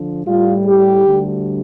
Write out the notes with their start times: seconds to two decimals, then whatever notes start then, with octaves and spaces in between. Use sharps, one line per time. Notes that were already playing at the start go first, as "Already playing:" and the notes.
Already playing: D3 F3
0.25 A2 G3 F4
0.65 G4
1.04 D2 D3 G3